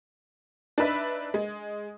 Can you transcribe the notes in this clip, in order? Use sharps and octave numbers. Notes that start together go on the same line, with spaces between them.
D4 D#4 B4 E5
G#3